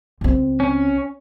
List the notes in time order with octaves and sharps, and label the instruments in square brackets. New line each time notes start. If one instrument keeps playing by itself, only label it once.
[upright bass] C#2 C4
[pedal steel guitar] C#4